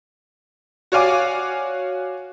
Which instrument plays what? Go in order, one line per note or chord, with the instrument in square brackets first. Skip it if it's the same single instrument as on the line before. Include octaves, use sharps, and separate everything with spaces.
[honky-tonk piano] F#4 C#5 D5 F5 G#5 D6